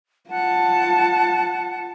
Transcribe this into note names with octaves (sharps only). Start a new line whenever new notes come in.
F4 F#5 A5